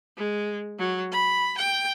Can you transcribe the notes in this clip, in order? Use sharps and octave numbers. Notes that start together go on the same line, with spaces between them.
G#3
F#3
B5
G5